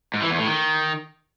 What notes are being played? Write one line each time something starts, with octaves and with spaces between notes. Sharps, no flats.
G#2
E3
E2
A2
D#3